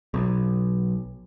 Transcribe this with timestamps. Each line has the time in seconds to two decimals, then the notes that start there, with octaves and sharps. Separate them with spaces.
0.14 B1